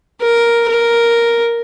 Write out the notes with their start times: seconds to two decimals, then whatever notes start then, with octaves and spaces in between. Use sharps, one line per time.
0.21 A#4
0.68 A#4